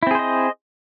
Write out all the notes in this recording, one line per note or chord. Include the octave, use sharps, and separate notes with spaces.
C4 E4 G#4 C5 D#5